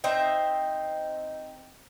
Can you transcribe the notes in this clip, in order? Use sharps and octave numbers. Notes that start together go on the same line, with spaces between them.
C4 D#4 C5 E5